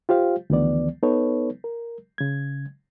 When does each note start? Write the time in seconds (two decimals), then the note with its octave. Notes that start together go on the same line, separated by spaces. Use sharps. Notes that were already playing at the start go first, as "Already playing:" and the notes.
0.09 F4 G4 C5 F5
0.50 D2 D#3 E3 B3 D5
1.02 B3 D#4 A4 B4 C#5
1.64 A#4
2.18 C#3 G#6